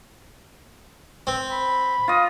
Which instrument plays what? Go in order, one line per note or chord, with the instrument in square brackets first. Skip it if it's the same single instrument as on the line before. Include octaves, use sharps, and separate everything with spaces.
[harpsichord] C4
[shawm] B5
[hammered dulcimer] F4 D#5